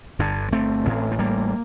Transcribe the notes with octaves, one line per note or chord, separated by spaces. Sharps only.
G1 G2 D3
A3 C4
A1 A2
A3
G3 A#3